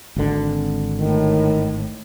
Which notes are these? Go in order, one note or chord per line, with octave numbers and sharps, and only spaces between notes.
G#1 D3
A2 D#3